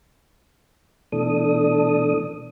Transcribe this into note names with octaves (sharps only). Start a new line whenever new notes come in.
B2 E3 A3 D4 A4 D#6